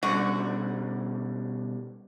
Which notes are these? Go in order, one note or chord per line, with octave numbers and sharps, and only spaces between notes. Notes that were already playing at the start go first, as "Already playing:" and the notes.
B2 D3 G3 C#4 F#4